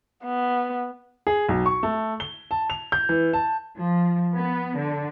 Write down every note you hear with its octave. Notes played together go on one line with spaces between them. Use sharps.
B3
G#4
B1
C#6
A3
G7
A5
F7
G6
E3
A5
F3
B3
D3